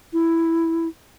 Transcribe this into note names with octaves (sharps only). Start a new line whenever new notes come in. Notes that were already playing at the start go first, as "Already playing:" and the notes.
E4